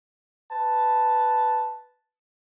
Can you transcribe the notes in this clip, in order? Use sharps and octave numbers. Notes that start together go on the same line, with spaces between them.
B4 A5